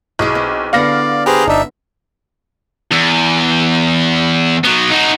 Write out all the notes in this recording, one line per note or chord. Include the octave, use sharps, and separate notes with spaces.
B1 E4 G#4
C4
D3 B3 D5 F5 F#5 A#6
G4 G#4 B4 C5 A#5
G1 D4 D#4 E5
E2
F#3 B3
D#4 F#4